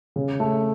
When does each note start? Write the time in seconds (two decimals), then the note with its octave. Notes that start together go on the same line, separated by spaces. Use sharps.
0.16 C#3
0.40 A3